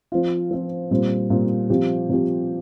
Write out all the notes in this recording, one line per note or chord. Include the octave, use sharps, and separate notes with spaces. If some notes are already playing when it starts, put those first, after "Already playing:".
F3 C4 F4
F3 C4 F4
A#2 G3 C4 F4
A#2 G3 C4 F4
C3 F3 C4 G4
C3 F3 C4 G4